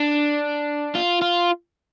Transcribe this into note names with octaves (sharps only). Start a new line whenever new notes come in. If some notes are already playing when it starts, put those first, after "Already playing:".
Already playing: D4
F4
F4